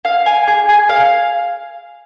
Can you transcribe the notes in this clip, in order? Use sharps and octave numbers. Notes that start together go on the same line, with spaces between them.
F5
G#5
G#4
G#4
F5